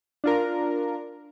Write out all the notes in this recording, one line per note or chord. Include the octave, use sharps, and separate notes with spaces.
D4 F4 A#4